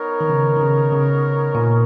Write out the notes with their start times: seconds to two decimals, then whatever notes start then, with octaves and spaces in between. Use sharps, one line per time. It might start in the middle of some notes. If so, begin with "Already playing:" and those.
Already playing: B3 D#4 A#4 C#5
0.21 D#3
0.30 C#3
0.57 D#3
0.61 C#3
0.92 C#3
1.55 A#2